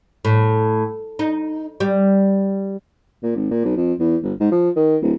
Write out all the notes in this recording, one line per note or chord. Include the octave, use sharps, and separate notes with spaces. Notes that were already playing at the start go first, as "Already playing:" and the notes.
A2
D#4
G3
A#2
G#1
A#2
B1
F2
E2
G1
G#2
F3
D#3
D1